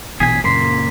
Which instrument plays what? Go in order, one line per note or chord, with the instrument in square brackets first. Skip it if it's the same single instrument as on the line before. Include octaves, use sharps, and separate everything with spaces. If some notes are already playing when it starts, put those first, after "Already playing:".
[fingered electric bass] A#1 B2 E3 [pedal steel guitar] G#4 G#5 [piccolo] B6
[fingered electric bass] F#2 A#2 C#3 [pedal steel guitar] A#3 C6 [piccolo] B6